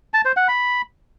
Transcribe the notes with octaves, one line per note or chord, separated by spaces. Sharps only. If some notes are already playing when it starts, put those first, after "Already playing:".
A5
C5
F#5
B5